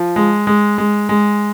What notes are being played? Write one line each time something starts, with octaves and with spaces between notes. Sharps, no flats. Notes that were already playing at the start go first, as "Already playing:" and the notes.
Already playing: F3
G#3
G#3
G#3
G#3